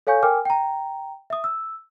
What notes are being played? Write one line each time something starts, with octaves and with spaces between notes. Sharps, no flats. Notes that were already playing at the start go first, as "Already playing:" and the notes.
A4 C#5 F5 G#5 C#6 G6
A#4 G5 G#5 D6 F6
G5 A#5
E5 D#6
E6